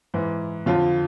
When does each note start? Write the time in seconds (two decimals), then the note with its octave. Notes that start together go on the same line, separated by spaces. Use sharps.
0.14 G#2 E3
0.66 F2 D3 F4